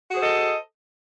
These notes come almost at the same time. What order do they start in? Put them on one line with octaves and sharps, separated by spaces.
F#4 G#4 C5 A4 D#5